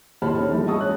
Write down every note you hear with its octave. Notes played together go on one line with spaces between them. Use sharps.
D#2 A2 C5 A5 B5 F6
A3 C#4 D#4 A4
A#1 E2 G2 F3 A3
G#4 D#5 A5 C#6 D#6 E6
G#1 C#4 F#6